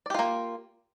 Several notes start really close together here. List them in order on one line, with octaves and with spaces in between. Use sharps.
D5 G4 F4 A#3